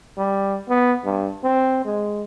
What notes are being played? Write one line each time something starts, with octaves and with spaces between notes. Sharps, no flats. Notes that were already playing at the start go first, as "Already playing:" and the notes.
G3
B3
G2
C4
G#3